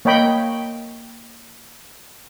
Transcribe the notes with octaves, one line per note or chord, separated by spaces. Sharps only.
A#3 C#5 D#5 G5 B5